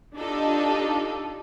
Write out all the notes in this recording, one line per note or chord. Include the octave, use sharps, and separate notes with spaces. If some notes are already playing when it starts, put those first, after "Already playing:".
D4 D#4 F4 G4 A4 D#5